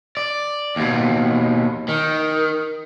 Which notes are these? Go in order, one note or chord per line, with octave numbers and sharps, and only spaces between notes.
D5
D#2 B2
D#3